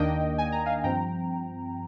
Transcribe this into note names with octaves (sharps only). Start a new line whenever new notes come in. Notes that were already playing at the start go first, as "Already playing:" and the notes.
Already playing: D#2 D#3 A#3 D4 D#5 G5
G#5
A#5
F5 G#5
G2 F3 C4 G5 A#5